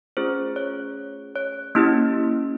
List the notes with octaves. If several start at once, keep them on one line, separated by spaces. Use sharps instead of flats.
A3 C#4 F4 G#4 C5
C#5
C#5
A#3 C#4 E4 G4